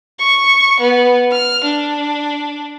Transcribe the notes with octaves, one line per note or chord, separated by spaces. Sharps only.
C#6
B3
F6
D4